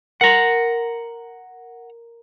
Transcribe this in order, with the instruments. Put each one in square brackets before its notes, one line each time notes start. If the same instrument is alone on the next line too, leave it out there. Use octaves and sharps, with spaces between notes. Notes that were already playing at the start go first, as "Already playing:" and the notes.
[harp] A#4 C6 [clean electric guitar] F#5 A#5